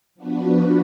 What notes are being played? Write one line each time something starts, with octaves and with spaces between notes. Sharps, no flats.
F3 B3 D4 F#4 B4